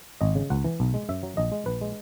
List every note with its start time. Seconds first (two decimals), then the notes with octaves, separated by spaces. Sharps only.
0.21 G#1 D#5
0.35 C#3
0.50 C#2 F#5
0.64 E3
0.80 B1
0.94 G#3
1.09 F#2 E5
1.23 F#3
1.37 A#1 D#5
1.52 G#3
1.66 A#1 B4
1.81 G#3